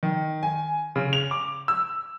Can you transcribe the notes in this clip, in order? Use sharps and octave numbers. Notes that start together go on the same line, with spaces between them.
D#3
G#5
C#3
F7
D6
E6